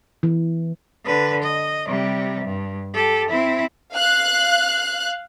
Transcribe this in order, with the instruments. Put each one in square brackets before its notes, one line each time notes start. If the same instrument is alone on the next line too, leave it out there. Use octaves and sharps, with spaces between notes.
[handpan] E3
[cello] D3 B4
D#5
C3 G3
G2
G4 A4
C4 E4
[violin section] F5 F#6